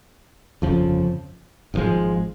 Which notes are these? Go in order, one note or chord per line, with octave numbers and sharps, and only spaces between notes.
G1 F2 C#3 F3
G#1 G2 F3 G#3